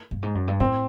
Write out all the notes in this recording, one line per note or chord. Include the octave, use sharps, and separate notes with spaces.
G2
G#2
F#2
G2
A2 C4